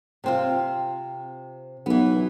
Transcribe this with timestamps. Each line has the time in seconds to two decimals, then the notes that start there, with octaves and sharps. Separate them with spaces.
0.24 C3 C4 F4
1.86 B1 E3 B3